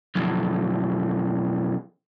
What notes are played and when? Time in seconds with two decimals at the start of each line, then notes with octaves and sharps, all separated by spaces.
0.15 B1 F2